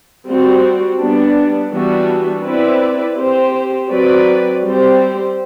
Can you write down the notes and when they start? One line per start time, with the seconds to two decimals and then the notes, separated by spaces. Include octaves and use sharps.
0.27 G3 C4 F#4
0.98 G3 B3 D4
1.71 E3 G3 B3 D4 F#4
2.45 C4 E4 B4 D5
3.18 C4 G4 C5
3.90 F#3 C4 F#4 B4 D5
4.63 G3 C4 G4 C5